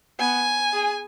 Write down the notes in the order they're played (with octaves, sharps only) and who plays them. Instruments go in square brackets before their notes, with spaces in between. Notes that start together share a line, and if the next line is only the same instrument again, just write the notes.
[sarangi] B3 [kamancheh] G#5
[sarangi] G#4